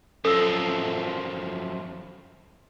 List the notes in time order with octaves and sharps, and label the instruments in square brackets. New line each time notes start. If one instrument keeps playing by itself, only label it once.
[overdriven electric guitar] F#2 F3 [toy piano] A4 E6